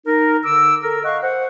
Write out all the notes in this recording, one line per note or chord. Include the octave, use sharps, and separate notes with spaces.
D#4 A#4
D3 D6 E6
A4 A#4
D#5 F5 F#5 C#6
C5 F#5